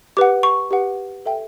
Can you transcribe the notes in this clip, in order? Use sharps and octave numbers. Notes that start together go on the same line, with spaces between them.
G4 B4 F#5 D6
C#6
G4 B4 F#5
A4 E5 G5